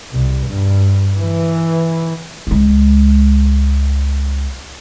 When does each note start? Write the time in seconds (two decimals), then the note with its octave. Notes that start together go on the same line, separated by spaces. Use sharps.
0.12 C2
0.47 G2
1.18 E3
2.47 C#2 G#3